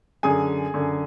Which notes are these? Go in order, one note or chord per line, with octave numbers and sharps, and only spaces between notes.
F#2 D3 G#4 G#5
F#2 D3